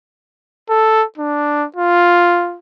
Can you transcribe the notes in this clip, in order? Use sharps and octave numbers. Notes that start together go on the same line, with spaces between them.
A4
D4
F4